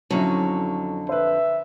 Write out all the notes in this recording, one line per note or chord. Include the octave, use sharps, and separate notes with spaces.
F2 D3 F#3 C#4 E4
B4 C5 E5